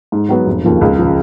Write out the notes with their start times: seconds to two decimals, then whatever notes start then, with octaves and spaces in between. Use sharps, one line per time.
0.12 G#2
0.29 F#3 B3 F#4
0.46 F1
0.65 D#2 C#3 F3
0.81 C#2
0.98 C#3 F3